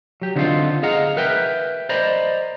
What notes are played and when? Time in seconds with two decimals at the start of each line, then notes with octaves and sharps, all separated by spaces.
0.22 F#3 G4
0.36 D3 B3 C4 D#4 F4 A4
0.83 G#4 D#5 F5 F#5 A#5
1.17 A#4 B4 E5 G5
1.89 C5 D5 D#5 A#5 B5